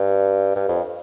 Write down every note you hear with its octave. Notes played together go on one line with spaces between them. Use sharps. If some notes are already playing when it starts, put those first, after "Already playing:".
Already playing: G2
G2
F2